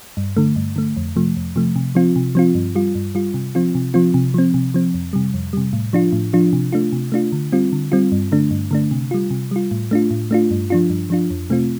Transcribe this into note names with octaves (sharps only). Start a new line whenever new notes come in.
G2
D3 A3
G2
D3 A3
F2
C3 F3 A3
F2
C3 F3 A3
C3
F3 C4 F4
C3
F3 C4 F4
G2
G3 F4
G2
G3 F4
C3
F3 C4 F4
C3
F3 C4 F4
C3
F3 C4
C3
F3 C4
F2
C3 G3
F2
C3 G3
A2
F3 D4 F4
A2
F3 D4 F4
C3
A3 D4 F4
C3
A3 D4 F4
D3
G3 C4 F4
D3
G3 C4 F4
G2
D3 A3 D4
G2
D3 A3 D4
C3
G3 F4
C3
G3 F4
A2
A3 D4 F4
A2
A3 D4 F4
G2
F3 D4 F4
G2
F3 D4 F4
F2
C3 A3 C4 F4